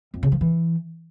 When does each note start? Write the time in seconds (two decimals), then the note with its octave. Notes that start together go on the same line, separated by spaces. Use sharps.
0.14 F2
0.23 C#3
0.32 F3
0.41 E3